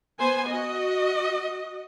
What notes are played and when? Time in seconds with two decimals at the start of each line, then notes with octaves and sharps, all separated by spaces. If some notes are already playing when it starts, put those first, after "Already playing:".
0.19 B3 C5 G#5
0.50 F#4 D#5